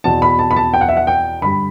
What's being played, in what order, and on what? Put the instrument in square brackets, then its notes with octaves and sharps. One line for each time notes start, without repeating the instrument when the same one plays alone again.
[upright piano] E2 B2 A5
B5
A5
B5
A5
G5
F#5
E5
F#5
G5
G2 D3 B5